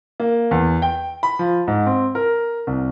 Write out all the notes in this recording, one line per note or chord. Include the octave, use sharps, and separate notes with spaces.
A#3
E2
G5
B5
F3
G#2
C4
A#4
C2